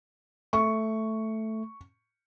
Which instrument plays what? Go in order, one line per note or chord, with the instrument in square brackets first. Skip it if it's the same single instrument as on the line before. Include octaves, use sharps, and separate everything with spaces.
[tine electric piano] A3 [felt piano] C#6